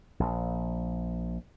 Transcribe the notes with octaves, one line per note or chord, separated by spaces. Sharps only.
A#1